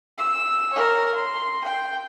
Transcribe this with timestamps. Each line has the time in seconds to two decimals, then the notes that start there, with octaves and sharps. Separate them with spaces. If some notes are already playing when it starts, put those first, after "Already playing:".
0.18 E6
0.73 A#4 C#5
1.14 C6
1.64 G5